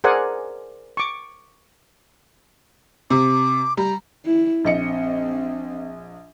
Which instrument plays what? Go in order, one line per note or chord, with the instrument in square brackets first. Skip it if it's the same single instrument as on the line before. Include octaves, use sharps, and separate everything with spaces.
[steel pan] G#4 A#4 C5 D5 F#5 G#5
C#6 D6
[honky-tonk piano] C3 [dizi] D6
[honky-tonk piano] G3 [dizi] A#5
[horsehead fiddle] E4
[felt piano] A#1 D#5 C#7 [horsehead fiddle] C4